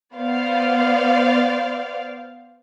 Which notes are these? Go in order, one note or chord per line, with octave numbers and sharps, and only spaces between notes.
B3 C5 D5 F5